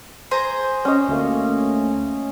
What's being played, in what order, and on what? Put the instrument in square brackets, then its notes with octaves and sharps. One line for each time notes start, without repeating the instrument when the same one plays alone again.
[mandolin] G#4 C5 A#5
[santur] C#4 D#5
[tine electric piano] D2 A3 A#3